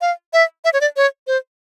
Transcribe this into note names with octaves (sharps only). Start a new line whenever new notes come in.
F5
E5
E5
C#5
D5
C#5
C5